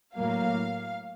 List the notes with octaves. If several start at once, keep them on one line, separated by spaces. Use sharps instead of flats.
A2 F#3 A#3 F5